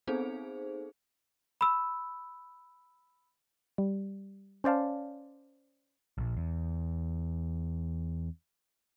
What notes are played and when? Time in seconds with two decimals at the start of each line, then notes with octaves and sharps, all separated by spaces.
0.07 B3 C4 D#4 G#4 A4 C5
1.61 B5 E6
3.78 G3
4.64 C#4 C5 D5 F5 A5
6.18 A#1
6.37 E2